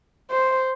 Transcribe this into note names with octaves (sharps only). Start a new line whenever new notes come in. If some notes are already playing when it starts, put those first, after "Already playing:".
C5